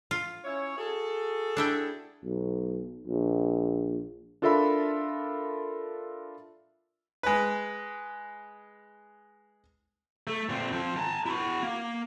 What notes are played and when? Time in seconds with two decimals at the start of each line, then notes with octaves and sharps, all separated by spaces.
0.11 F4
0.45 C#4 E4 C#5
0.77 F#4 G#4 A4
1.57 D4 E4 G5
2.24 B1
3.07 A#1
4.42 D4 F4 A4 A#4 E5 B5
7.23 G#3 B4
10.27 A3
10.49 A#2 C4
10.73 F3 C4
10.97 A5 A#5
11.26 E4 F#4
11.63 A#3